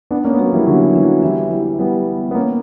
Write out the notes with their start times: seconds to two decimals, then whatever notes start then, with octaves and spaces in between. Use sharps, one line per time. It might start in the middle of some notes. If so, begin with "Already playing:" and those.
0.11 B3 D4
0.24 A#3 C#4
0.33 B3
0.39 F#3 A#3
0.53 E3 G3
0.67 D3 F#3
0.95 E3
1.23 E3 G3
1.51 E3 G3
1.79 G3 B3
2.31 B3
2.35 A#3 C#4